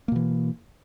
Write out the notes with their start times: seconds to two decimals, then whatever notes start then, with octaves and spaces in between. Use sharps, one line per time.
0.08 A#3
0.12 B2
0.16 E3